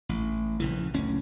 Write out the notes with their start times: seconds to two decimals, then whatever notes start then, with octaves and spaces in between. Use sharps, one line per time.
0.09 A1
0.60 A#1 C#3 E3
0.94 F#1 D2 C#4